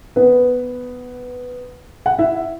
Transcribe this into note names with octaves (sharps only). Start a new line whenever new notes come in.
B3 B4
F#5
E4 E5